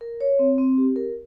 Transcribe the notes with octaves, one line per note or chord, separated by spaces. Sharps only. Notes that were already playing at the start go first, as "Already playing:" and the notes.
A#4
C#5
C4
C4
G4
A#4